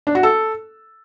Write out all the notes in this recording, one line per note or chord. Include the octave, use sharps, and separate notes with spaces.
D4
F#4
A4